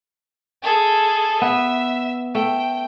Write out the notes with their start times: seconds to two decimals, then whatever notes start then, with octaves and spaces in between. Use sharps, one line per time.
0.63 G#4 A4
1.42 B3 E5
2.35 A3 G5